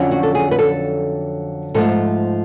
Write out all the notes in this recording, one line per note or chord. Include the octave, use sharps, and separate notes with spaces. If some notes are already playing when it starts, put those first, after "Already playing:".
Already playing: F2 D3 F#3 C#4
F#4
A4
G#4
B4
A4
G#2 F3 A3 A4